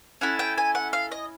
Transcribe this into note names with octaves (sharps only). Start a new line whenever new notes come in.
C#4 E4 A4 F#5
G5
G#5
F#5
F5
D#5